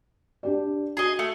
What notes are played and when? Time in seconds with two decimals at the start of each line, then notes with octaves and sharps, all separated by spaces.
0.43 D4 G4 D5
0.97 F#4 G#4 D#5
1.19 A3